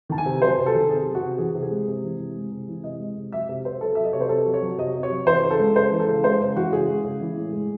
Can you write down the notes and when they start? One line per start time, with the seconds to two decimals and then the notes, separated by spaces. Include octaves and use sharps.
0.09 D#3 A5
0.18 G#5
0.26 C3
0.42 F#3 C5
0.58 C3
0.66 A4
0.75 D#3
0.90 C3 G#4
1.06 F#3
1.15 F#4
1.22 C3
1.38 E3 G#4
1.55 C3
1.63 G#4
1.71 G#3
1.88 C3
2.04 E3
2.20 C3
2.36 G#3
2.52 C3
2.68 E3
2.84 C3 D#5
3.00 G#3
3.17 C3
3.32 F#3 E5
3.49 C3
3.65 C3 C5
3.81 F#3 A4
3.95 F#3 E5
4.03 D#5
4.13 C3 C#5
4.21 C5
4.29 C3 A4
4.46 F#3
4.54 C#5
4.62 F#3
4.78 C3 D#5
4.95 C3
5.03 C#5
5.11 F#3
5.26 E3 C5
5.43 C#3
5.50 A4
5.60 G#3
5.76 C#3 C5
5.92 E3
6.00 A4
6.08 C#3
6.24 G#3 C5
6.41 C#3
6.55 E3 F#4
6.72 C#3 G#4
6.88 G#3
7.04 C#3
7.21 E3
7.37 A2
7.53 G#3